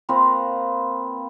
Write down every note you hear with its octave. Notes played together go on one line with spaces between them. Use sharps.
A#3 C4 F4 B4